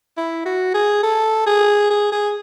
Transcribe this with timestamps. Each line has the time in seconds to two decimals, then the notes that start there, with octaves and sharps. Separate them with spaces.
0.17 E4
0.45 F#4
0.74 G#4
1.03 A4
1.47 G#4
1.91 G#4
2.12 G#4